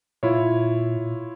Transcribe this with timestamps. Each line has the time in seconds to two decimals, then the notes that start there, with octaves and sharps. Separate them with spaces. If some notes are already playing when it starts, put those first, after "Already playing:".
0.23 A#2 E4 F4 C#5